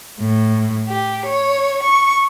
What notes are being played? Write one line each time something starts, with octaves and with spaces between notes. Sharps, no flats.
A2
G4
C#5
C#6